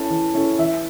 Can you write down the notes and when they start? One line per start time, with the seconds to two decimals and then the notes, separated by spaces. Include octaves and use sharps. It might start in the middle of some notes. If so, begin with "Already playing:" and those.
Already playing: C#4 E4 A4 A5
0.10 E3
0.34 C#4 E4 A4
0.59 E3 E5